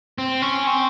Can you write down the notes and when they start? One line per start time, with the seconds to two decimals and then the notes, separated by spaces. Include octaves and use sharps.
0.18 C4
0.42 C#4
0.67 C4